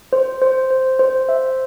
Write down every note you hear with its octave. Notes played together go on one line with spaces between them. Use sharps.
C5
C5
C5
C5
E5